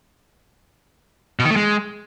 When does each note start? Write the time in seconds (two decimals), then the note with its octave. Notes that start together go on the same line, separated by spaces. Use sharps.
1.39 B2
1.45 D#3
1.51 A3
1.56 G#3